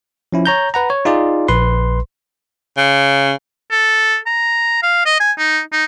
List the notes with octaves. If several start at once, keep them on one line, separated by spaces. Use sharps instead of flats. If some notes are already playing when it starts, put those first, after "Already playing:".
F3 C#4 E4
C#5 A#5 G6
B4 F#5 A#5
C#5
D#4 F4 G#4 D5
A#1 B4 C6
C#3
A4
A#5
F5
D#5
G#5
D#4
D#4